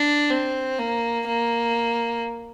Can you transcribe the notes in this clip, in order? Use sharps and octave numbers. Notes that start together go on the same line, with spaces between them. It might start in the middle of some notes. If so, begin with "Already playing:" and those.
Already playing: D4
C4
A#3
A#3